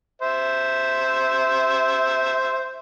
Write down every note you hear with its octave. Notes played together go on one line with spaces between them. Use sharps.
C5 E5